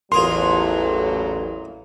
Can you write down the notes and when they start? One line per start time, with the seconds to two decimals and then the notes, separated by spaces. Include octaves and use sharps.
0.12 A1 E2 A#2 F#3 F4 G#4 A#4 C6